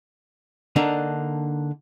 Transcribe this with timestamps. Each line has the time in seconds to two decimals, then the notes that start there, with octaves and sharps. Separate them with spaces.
0.76 D3 A#3 D4 D#4